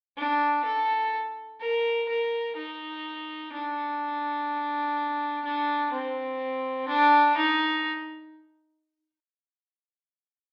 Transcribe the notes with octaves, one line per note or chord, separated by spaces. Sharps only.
D4
A4
A#4
A#4
D#4
D4
D4
C4
D4
D#4